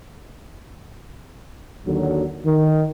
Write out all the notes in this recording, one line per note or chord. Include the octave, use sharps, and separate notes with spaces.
D#2 D3 F#3
D#3